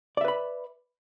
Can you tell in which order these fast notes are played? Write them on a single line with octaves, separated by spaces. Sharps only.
D5 E5 B4 B5